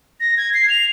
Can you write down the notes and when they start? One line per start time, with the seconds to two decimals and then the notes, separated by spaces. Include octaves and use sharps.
0.20 A#6
0.37 G#6
0.54 C7
0.70 F7